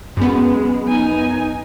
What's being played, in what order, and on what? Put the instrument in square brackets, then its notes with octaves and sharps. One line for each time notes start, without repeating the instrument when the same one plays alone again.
[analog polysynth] F#2 B3 [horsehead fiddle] G#3 C#4
[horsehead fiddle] D#4 G#5